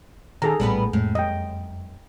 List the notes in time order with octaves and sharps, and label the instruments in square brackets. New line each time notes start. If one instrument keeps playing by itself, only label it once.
[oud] D#3 [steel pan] G#4 A4 A#5
[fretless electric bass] A#1 A2 [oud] G3 B3 B4
[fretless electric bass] F2 G#3 A#3 [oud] A2
[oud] F#2 [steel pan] D#5 G5